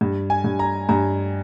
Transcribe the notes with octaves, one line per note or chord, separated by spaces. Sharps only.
G2
G#5
G2
A#5
G2 A#5